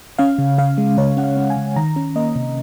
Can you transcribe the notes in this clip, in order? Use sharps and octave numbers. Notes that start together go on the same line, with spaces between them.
C#4 F5
C#3
C#3 F5
G#3
C#3 C#5
C#4 F#5
F5
C#4
G#5
C#3
D#3 A#5
C#4
A#3 D#5
C3